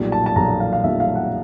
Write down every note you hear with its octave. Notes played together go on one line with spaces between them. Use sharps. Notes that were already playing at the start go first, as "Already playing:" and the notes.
Already playing: B1 A#2 G3
A5
A5
B1 A#2 G3 A#5
F5
F5
B1 A#2 G3 E5
F5
F#5